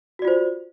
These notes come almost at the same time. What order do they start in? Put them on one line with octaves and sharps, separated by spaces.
F#4 D5 F4 C5